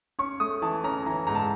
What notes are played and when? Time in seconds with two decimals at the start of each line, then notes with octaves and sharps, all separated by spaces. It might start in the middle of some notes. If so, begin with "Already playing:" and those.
0.19 C#4 C#6
0.40 A3 D#6
0.62 E3 A5
0.84 C#4 A#5
1.06 E3 A#5
1.27 G#2 A#5
1.35 A5